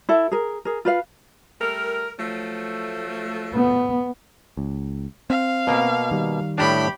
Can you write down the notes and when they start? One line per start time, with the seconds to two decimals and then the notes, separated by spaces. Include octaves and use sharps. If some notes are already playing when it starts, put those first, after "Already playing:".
0.09 E4 A4 E5
0.32 G#4 A#4
0.65 G#4 A#4
0.85 F4 B4 F5
1.61 G3 A3 A#4
2.19 F3 F#3 A3
3.54 B3
4.57 C#2
5.30 C4 F5
5.67 B2 A#3
6.11 D#3 G3
6.58 A2 D4 G4 B5